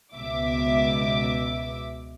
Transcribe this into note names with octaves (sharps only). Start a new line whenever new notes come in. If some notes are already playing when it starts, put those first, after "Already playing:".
C#2 B2 E5 D6